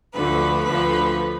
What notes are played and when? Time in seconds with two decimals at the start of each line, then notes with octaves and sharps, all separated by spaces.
0.15 D2 D3 F3 A3 B4
0.65 D2 D3 F3 A3 B4